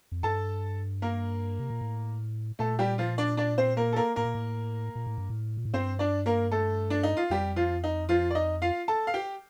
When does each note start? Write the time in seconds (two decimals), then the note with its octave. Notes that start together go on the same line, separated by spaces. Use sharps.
0.12 F2
0.23 G2 A4 A5
1.02 A#3 A#4
1.59 C3
1.70 A#2
1.81 A2
2.59 A#2 A3 A4
2.79 G3 G4
2.98 F3 F4
3.18 D4 D5
3.37 D4 D5
3.58 C4 C5
3.77 A#3 A#4
3.93 A4
3.96 A#3 A#4
4.16 A2 A#3 A#4
4.25 A#2
4.35 A2
4.95 A#2
5.06 A2
5.18 G2
5.30 A2
5.57 A#2
5.65 A2
5.73 G2 C4 C5
5.99 D4 D5
6.26 A#3 A#4
6.52 A3 A4
6.90 D4
7.03 D#4
7.17 F4
7.30 F2 G3 G4
7.56 F3 F4
7.84 D#4
8.09 F3 F4
8.31 D5
8.35 D#4 D#5
8.62 F4 F5
8.88 A4 A5
9.07 F5
9.14 G4 G5